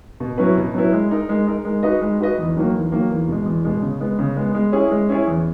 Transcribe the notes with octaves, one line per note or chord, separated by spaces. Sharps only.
B2
F#3 C#4 E4 B4
B2
F#3 C#4 E4 B4
G#3
D#4 A#4
G#3
D#4 A#4
G#3
D#4 F#4 B4 D#5
G#3
D#4 F#4 B4 D#5
E2
D#3 F#3 A#3
E2
D#3 F#3 A#3
E2
B2 G#3
E2
B2 G#3
C#3
G#3 B3
C#3
G#3 B3
G#3
C#4 E4 G#4 C#5
G#3
C#4 E4 G#4 C#5
E2